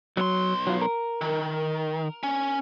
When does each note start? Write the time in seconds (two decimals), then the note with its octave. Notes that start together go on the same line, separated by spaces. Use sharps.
0.17 B1 F#3 C6
0.67 F#3 F4
0.82 A#4
1.21 D#3
2.23 C#4